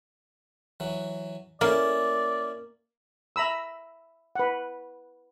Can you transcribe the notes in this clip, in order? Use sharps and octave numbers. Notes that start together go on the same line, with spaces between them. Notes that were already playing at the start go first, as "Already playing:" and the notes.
E3 F#3
A#3 C#4 E4 D5
E5 A#5 B5 E6
B4 F#5